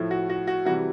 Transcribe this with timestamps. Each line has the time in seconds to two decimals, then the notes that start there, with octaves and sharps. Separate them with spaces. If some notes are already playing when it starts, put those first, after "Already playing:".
Already playing: A2 F3 A3
0.11 F#4
0.30 F#4
0.47 F#4
0.65 C3 E3 G3 F#4